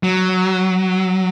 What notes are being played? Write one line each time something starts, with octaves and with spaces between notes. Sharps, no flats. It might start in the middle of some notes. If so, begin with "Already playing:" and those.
F#3